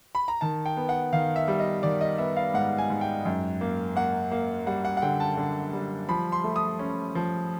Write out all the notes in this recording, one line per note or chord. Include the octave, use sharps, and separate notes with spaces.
B5
A#5
D#3 A5
G5
B3
F#5
D#3 F5
E5
G3
D#5
D#3 D5
D#5
B3 E5
F5
G#2 F#5
G#5
G#2
G5
F#2
A#3
A#3 F#5
A#3
G3 F#5
F#5
F#5
D3 G5
A5
D3
G3
F3 B5
C6
A3
D#6
C#4
F3